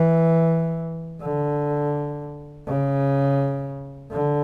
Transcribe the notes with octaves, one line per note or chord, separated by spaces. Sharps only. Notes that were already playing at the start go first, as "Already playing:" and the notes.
Already playing: E3
D3
C#3
D3